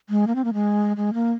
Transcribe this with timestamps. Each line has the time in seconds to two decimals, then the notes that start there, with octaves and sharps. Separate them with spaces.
0.09 G#3
0.27 A#3
0.35 C4
0.45 A#3
0.54 G#3
0.97 G#3
1.14 A#3